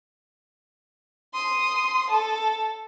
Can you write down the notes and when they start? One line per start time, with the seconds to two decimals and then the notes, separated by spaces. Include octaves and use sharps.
1.33 C6 D#6
2.11 A4